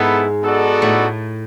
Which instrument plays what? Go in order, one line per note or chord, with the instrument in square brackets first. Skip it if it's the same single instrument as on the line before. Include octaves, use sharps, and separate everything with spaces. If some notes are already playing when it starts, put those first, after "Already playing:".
Already playing: [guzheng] G#2 G#3 [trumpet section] B3 E4 A4
[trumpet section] B3 D#4 F#4 A4 D5
[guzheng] A2 A3